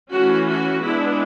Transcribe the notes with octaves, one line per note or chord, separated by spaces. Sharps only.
E3 A3 C#4 F#4
F#4
G#3 B3 D4 E4